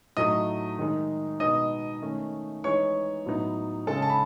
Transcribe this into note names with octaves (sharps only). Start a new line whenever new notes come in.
A2 F#3 A3 D#4 D#5 D#6
D#3 G#3 D#4
B2 G#3 B3 D#4 D#5 D#6
D#3 A3 C#4
E3 G#3 D#4 C#5 C#6
A2 F#3 B3 D#4
C#3 G#3 C#4 A4 A5
A5
B5